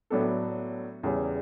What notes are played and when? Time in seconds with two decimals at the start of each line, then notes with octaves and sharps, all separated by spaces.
0.10 A2 F#3 B3 D4 A4
1.03 E2 C#3 G3 C#4